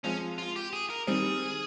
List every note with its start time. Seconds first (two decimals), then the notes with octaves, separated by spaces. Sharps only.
0.04 F3 G#3 C4 C#4
0.38 F4
0.56 G4
0.73 G#4
0.90 A#4
1.07 D#3 G3 C4 G#4